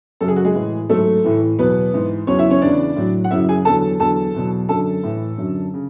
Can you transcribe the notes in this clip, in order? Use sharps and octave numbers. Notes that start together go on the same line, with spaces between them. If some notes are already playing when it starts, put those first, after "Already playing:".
F#2 C#3 F#3 A4
G#4
F#4
G#3 G#4
A2 E3
G#2 F#3 A3 A4
A2 E3
E2 B2 F#3 B3 B4
G#2 E3
E2 C#3 F#3 C#4 C#5
E4 E5
C#4 C#5
E2 C#3 E3 D4 D5
A2 F#3
F#5
F#2 C#3 F#3 E4 E5
G#4 G#5
E2 D3 F#3 A4 A5
E2 D3 F#3 A4 A5
E2 B2 F#3
F#2 D3 F#3 A4 A5
A2 E3
F#2 D3 F#3
C#3